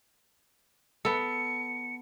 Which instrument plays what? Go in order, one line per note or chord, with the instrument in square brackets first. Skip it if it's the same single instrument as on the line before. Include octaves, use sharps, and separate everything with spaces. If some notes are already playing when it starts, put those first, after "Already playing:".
[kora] B3 A4 [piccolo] C#7